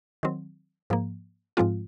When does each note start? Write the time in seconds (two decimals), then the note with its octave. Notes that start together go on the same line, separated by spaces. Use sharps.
0.23 D#3 F#3 C4
0.90 G#2 F3 A#3
1.57 G#2 F3 G#3 C4 F4